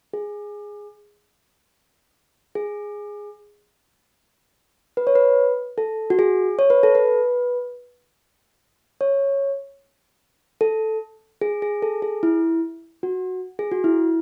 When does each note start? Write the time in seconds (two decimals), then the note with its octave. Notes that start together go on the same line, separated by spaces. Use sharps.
0.13 G#4
2.55 G#4
4.97 B4
5.07 C#5
5.15 B4
5.78 A4
6.10 F#4
6.19 G#4
6.59 C#5
6.70 B4
6.83 A4
6.95 B4
9.01 C#5
10.61 A4
11.41 G#4
11.62 G#4
11.82 A4
12.02 G#4
12.23 E4
13.03 F#4
13.59 G#4
13.71 F#4
13.84 E4